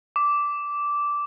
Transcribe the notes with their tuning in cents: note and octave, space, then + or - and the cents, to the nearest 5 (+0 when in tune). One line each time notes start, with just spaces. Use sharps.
D6 -10